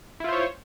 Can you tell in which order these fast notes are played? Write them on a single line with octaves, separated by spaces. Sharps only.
E4 F4 C5 C#5